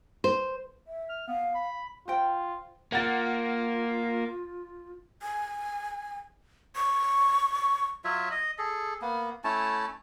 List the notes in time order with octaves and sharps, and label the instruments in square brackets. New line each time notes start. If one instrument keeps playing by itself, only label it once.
[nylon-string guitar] C5
[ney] E5
[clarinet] F6
[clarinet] B3 [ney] F5
[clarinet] B5
[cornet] F4 [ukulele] C5 G5
[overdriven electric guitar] A#3 [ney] F4 [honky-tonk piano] F#5 A6
[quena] G#5
C#6
[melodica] F#3 F4 C#5 E5
D#5
G#4 A4
A#3 B3
A3 C#4 E4 A5